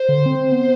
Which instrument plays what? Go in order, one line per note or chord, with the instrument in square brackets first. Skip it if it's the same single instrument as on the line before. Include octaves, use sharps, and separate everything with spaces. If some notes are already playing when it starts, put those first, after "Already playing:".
Already playing: [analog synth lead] C5
[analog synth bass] D3
C4
B3